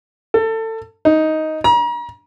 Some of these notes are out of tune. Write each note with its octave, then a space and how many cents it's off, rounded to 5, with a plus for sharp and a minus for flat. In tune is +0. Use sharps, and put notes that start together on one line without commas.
A4 +25
D#4 +10
A#5 +40